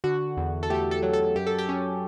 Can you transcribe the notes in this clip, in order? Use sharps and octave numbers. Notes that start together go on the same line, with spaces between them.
D3 F#4
E2
A4
A3 G4
A4
F#3
A4
F#2 G4
A4
G4
C#4